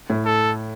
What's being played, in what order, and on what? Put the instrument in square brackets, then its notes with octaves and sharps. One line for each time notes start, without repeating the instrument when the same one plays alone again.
[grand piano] A2
[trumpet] A4